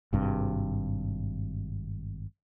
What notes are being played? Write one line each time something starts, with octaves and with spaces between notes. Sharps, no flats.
G#1 G2 C3